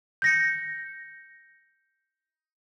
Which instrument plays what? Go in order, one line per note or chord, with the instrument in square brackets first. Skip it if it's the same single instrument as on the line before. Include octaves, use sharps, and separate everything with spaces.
[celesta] G6 A#6 C#7